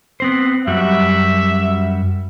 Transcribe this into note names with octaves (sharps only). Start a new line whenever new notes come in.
B3 C4 C5
F#2 G3 F#4 E5